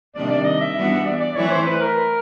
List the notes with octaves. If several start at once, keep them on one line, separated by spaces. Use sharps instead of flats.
C3 D#3 G3 A#3 D4 D5
D5
D#5
E5
E3 G3 B3 D4 F#4
D5
D5
E3 A3 C4 E4 C#5
C5
B4
A#4